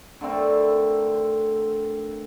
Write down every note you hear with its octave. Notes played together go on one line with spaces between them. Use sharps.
D3 A3 C4 A#4